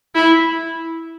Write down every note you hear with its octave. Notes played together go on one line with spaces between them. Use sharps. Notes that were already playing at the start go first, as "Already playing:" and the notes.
E4